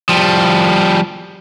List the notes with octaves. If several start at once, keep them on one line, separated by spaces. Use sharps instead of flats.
F3 G3